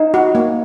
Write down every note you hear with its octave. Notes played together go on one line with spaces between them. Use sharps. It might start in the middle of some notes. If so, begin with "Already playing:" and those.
Already playing: D#4
F#4
A#3